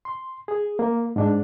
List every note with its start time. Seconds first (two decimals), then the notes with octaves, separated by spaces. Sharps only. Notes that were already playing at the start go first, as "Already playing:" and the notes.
0.05 C6
0.48 G#4
0.79 A#3
1.16 G#2 D4